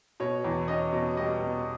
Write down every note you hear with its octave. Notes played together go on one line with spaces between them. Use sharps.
B2 C#5
E2
C#4 D#5
B2
G3 D#5
B2